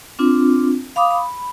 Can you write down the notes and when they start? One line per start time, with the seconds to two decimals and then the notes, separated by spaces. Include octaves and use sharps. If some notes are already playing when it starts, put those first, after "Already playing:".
0.19 C4 D4 F4
0.96 F5 B5 D6 D#6
1.11 B5